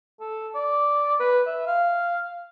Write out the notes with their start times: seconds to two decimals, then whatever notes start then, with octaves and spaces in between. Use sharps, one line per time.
0.20 A4
0.55 D5
1.20 B4
1.47 E5
1.67 F5